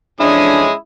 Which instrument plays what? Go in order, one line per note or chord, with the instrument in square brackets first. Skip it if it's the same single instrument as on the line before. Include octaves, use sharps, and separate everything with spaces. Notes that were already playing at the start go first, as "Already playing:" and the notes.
[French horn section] F2 E3 D4 [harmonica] G#3 C#4 D#6 [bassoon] E4